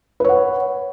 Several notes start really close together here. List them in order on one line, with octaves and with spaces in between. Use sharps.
B4 C#5 F#5